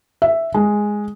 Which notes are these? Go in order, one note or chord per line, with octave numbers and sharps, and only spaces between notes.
E5
G#3